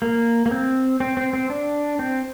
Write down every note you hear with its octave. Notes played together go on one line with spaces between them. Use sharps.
A#3
A#3
C4
C4
C4
C4
D4
C4